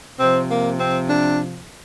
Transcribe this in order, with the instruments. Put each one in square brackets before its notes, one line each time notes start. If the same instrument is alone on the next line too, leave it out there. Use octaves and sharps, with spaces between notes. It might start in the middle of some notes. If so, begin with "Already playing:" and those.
[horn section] C3 F3 C4
A#3
C4
D4